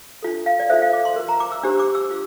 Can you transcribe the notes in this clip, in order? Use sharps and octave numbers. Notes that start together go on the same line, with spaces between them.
D4 F4 A4
F5
D5
F4 A4 C5 E5
F5
D6
C6
F4 A#4
A#5
D6
E6
D4 G4 C5 E6
D6
E6
F4